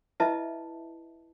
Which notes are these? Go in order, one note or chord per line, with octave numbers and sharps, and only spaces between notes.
E4 B4 D#5 E5 A5